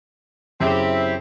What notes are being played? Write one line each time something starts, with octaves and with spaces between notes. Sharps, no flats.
F#2 C#3 C4 E4 G4